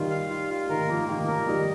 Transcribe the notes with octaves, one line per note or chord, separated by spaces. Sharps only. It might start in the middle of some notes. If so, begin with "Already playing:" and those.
Already playing: D#3 G3 F4
F5
F4
F4
D#3 A#4
F3 A#3
D#3 A#3
F3 A#4
D#3 G3 D#5